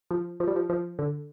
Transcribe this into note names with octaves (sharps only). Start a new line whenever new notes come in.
F3
F3
G3
F3
F3
D3